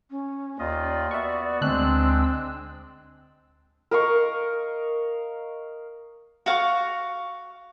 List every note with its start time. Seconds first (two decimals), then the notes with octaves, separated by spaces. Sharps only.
0.10 C#4
0.59 D#2 F4 D5 D#5
1.11 B3 F#4 E5 C#6
1.62 D2 G#3 C4 D4 E6 F#6
3.91 A#4 D#5 F5 C#6
6.46 F#4 F5 F#5 C#6